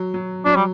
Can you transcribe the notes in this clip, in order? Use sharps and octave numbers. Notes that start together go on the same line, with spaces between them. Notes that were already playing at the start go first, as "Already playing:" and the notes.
Already playing: F#3
F#3
F#3 D4
G3